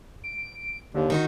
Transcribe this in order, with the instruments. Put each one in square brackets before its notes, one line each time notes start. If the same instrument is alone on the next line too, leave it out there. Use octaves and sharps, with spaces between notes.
[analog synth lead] D7
[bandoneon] D#2 [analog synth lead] D3
[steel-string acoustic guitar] D#3 D#4 F#4